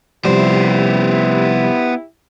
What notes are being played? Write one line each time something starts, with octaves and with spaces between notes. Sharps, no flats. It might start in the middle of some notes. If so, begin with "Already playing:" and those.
C3 F3 G3 B3 E4 G4 C5